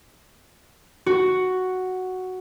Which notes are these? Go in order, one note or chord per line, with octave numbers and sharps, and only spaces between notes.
F#4